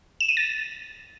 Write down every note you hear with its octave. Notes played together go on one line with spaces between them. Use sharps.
E7
D#7
A6